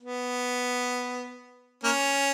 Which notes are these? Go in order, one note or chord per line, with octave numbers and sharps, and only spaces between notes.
B3
A#3 C#4